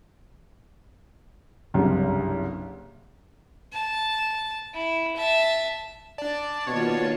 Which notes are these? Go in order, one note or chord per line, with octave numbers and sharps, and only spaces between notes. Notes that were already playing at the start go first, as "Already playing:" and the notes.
F#1 C2 G2
A5
E4
E5 A5
D4 D5 A5
B2 D#3 A#3 F4 C#5